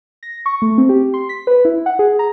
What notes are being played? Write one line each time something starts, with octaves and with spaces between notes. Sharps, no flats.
A#6
C#6
A3
C4
G4
C6
B6
B4
E4
F#5
G#4
A#5